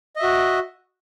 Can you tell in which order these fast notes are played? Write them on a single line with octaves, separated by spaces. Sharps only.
D#5 E5 F#4